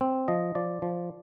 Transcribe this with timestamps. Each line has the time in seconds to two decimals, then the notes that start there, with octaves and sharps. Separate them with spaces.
0.01 C4
0.28 F3 D#5
0.55 F3 D5
0.82 F3